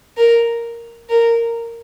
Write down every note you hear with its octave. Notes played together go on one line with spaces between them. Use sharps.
A#4
A#4